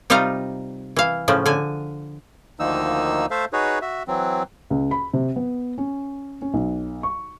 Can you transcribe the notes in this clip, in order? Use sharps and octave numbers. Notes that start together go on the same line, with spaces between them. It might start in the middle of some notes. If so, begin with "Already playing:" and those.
C3 G3 D#4 F4 F5 A#5
E3 F5
A2 C#3 F3
D3 G#5
D2 D#3 F3 A#3 D#4 E6
A3 A4 C5 E5 F5
D#4 F#4 G#4 B4 C#5
F#4 E5
E3 F#3 C4
C#2
B5
C3
B3
C#4
C#4
B1
C#6